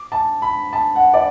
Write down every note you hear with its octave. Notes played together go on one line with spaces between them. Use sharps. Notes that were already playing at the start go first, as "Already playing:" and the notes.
Already playing: D6
A5
B5
A5
F#5
D5